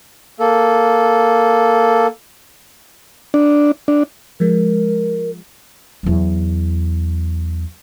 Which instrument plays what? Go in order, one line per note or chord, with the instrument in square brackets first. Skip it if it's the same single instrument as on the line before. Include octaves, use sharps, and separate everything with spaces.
[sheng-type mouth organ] A#3 A4
[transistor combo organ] D4
D4
[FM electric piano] F3 G#3 [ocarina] A#4
[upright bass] E2 F#3